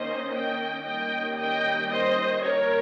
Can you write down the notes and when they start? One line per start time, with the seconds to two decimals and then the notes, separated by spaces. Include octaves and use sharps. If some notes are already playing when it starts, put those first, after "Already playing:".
Already playing: D#3 A#3 C#4 C5 D#5
0.32 D#5 G5
0.84 D#3 G3 A#3 C#4 D#5 G5
1.37 D#5 G5
1.90 C5 D#5
2.43 A#4 C#5